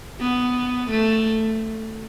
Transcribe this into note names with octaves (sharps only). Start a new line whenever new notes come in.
B3
A3